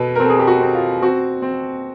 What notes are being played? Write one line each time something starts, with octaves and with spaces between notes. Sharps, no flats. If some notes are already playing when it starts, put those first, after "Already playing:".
Already playing: B2 A4 B4
A#4
C4 A4
G#4
G4
F#4
C4
F4
C4 F#4
C4